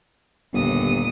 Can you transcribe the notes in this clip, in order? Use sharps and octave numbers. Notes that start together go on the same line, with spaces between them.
G1 D#2 A#2 D#6